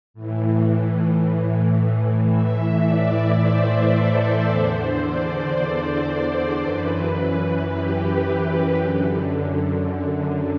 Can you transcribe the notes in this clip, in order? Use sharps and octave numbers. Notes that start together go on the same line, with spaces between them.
A2 E3
A2 E3 E5
D5
C5
A4
E2 D3 C5
D5
C5
F#2 E3 B4
G4
F#2 D3